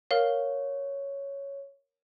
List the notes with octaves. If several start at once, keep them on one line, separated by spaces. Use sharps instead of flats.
A#4 C#5 F5